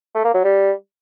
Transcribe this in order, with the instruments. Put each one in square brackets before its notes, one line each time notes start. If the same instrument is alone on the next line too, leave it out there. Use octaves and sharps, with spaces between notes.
[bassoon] A3
A#3
F#3
G3